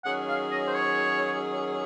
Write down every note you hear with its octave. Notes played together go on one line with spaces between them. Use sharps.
D#3 F#3 C#4 G#4 F#5
F5
D#5
C5
C#5